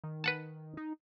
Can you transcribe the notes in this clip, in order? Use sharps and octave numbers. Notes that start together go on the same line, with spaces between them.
D#3
B4 F#5 A5
D#4